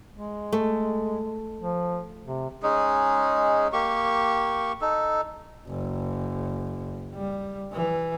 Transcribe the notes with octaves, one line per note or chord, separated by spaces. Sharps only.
G#3
A3
F3
C3
G#3 C#4 D#4 G#4
A#3 G4 C#6
D#4 A4
F#1
G3
E3